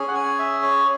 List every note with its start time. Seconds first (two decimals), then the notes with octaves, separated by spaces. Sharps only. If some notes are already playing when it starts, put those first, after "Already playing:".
Already playing: C#4 G#4
0.08 F#5
0.15 G#5
0.39 E5
0.63 C#5